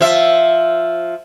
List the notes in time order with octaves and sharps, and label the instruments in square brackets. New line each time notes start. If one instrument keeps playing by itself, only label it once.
[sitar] F3 E5